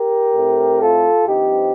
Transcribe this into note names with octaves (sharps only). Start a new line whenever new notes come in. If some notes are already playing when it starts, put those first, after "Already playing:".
Already playing: G4 A#4
A2 A3 C4
F4 A4
G2 F3 C4 D#4 G4